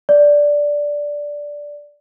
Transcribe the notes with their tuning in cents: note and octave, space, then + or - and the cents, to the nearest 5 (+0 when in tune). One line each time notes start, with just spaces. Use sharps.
D5 -5